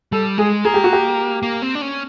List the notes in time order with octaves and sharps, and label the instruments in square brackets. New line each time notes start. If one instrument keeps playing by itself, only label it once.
[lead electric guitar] G3 [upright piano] A4
[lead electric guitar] G#3 [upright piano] G#4
[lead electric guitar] A#3 [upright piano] G#4
[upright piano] G4
F#4
G4
[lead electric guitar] A#3
C4
D4
C#4